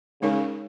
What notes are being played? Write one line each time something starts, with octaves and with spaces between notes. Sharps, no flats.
C#3 G#3 D#4 A#4 C#5